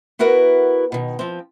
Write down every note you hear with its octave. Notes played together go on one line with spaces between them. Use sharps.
B3 E4 F#4 A#4 B4
B2 D#3
F3 C4